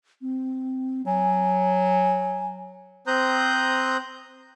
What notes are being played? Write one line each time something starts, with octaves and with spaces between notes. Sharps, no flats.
C4
F#3 G#5
C4 C5 A#5 D#6 F#6 G6